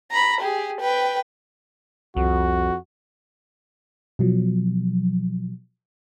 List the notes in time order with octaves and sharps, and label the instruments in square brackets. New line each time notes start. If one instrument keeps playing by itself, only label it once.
[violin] A#5 B5
G4 G#4
B4 G5
[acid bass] C2 [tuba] F2 [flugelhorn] F#4
[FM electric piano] B2 F3 F#3